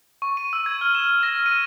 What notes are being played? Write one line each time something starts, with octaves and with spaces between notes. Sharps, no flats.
C#6
D#7
E6
G#6
F6
E7
A#6
D#7